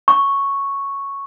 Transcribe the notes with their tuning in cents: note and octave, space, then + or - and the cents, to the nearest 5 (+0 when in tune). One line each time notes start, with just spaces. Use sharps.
C#6 +0